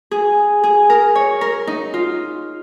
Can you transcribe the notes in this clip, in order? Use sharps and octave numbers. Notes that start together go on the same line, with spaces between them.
G#4
G#4
A#4
C#5
A#4
D#4
F4